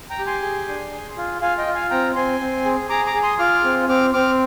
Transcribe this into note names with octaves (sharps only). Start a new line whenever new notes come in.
G5 A#5
G4
G#5 C6
G#4
D4
G#4
F4
F4 F5 G#5
D#5 G5
F4
F5 G#5
C4 G5 A#5
C4 G#5 C6
C4
G#4
G#4 A#5 D6
A#5 D6
G#4
C6 D#6
F4 D6 F6
C4
C4 D6 F6
C4 D6 F6